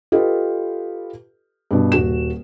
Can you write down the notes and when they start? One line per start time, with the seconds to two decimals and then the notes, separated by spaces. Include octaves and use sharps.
0.12 F4 G4 A4 B4 D#5
1.71 G2 B2
1.92 D#1 F#4 E7